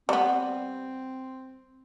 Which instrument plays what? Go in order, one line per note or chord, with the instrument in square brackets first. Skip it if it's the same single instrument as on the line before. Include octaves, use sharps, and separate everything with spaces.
[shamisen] G3 B3 [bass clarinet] C4